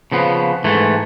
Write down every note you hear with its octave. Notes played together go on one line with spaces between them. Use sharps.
C#3 F3 B3
G#2 E3 A3